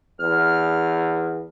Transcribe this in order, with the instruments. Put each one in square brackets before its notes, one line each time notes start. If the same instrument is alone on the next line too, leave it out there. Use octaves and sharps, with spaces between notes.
[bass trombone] E2 [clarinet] F6